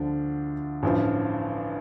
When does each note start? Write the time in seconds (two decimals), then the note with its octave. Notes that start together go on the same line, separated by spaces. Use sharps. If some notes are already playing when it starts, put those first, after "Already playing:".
Already playing: D2 D3 F3 D4
0.83 A1 G2 F3